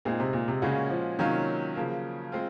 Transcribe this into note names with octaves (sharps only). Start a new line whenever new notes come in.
A#2 G#3 C4 D#4 G#4
C3
A#2
C3
A#2 C#3 G#3 C#4 F#4
F3
C3 D#3 F#3 A#3 C#4 F4
C#3 F3 A#3
G#3 C4 F4